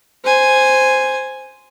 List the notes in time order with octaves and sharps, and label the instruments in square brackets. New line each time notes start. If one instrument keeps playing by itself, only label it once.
[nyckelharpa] C5 G#5